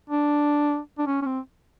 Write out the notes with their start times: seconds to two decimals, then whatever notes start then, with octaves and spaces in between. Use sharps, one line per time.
0.10 D4
0.98 D4
1.07 C#4
1.22 C#4
1.26 C4